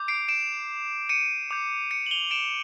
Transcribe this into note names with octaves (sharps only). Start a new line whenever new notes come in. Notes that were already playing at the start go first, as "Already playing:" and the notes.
Already playing: D6 G6
C7 D7
D7 E7
C#7 D#7
D6 G6
C#7 D#7
F#7
F7 G7
D7 E7